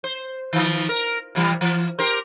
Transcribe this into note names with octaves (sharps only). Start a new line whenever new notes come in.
C5
D#3 F3
A#4
C3 E3 G3
E3
G4 A#4 C5